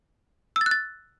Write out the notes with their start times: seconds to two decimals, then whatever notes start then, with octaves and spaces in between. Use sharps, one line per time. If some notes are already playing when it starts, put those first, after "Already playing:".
0.56 E6
0.61 A6
0.66 F#6
0.71 A6